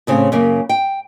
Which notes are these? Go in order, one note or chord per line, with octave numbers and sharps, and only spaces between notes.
A2 C#3 C4
F#2 C#3 A#3
G5